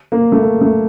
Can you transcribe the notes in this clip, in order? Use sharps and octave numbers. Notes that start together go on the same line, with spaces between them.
A#3
A3
A#3
A3